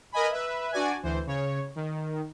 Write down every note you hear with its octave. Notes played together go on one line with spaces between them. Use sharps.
A#4 B4 D#5 G#5 B5
B4 E5
D4 F#4 D5 G#5
D2 E3 C5
C#3 C#5
D#3